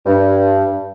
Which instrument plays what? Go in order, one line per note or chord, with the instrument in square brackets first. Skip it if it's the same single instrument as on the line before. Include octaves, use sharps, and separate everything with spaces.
[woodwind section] G2